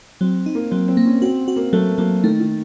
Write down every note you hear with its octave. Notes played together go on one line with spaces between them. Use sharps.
F#3 C4
D#4
A#3
F#3 C4
C4
A#3
C#4
C4 F#4
F#4
A#3
F#3 A3
F#3 A#3
D#3 A3
D#3